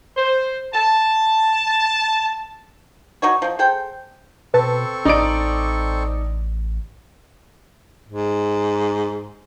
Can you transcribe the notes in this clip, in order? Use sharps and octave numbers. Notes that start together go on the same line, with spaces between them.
C5
A5
F#3 D#4 F#4 C#5
F3 D#4
G#4 A4 C5 G5
B2 C4 A4 B4 A5 C#6
A1 D#4 D5 D7
G#2